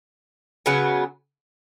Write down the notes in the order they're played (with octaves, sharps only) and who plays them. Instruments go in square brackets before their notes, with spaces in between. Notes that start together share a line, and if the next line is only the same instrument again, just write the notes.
[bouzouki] C#3 F#3 B3